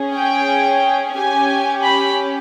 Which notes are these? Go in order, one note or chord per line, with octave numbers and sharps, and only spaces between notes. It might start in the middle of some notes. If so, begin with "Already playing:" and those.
Already playing: C#4 G#4
G5
C#4 G4 G#5
B5